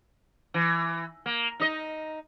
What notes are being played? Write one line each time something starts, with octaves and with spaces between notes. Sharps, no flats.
E3
A#3
D#4 D#5